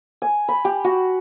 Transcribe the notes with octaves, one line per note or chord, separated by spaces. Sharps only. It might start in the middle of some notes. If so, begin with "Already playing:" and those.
G#5
B5
G4
F#4